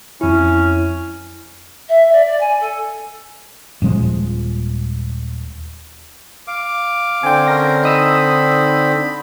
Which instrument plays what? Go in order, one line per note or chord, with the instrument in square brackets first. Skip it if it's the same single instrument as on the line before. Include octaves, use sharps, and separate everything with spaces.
[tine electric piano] F2 E4 [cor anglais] C#4
[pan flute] E5
D5
D5
G#5
A4
[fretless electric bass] D#1 A#2 F3 G#3
[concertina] F5 D6
[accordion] D3 C4 [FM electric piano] G5 G#5
[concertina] C#4 A#4 [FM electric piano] A#6
[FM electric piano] D#4 D#6 E6 [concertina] B5